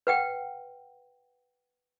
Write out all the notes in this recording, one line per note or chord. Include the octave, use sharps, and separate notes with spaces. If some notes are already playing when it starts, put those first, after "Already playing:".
B4 F#5 G5